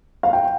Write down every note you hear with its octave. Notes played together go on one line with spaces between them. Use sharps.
F5
G5